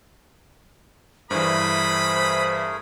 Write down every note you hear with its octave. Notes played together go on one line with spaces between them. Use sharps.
G2 E3 A3 G#4 A#4 C5 B5 D#6